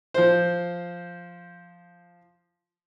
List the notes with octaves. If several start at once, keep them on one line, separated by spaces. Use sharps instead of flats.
F3 C5